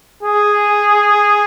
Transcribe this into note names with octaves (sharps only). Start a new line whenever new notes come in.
G#4